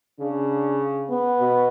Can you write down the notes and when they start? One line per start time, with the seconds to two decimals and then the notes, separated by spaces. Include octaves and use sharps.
0.20 C#3 D4
1.10 B3
1.40 B2